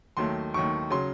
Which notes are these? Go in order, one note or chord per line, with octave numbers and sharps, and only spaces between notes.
D#2 D#3 F#3 A3 C6
D#2 D#3 F#3 A3 C#6
C#3 F#3 C6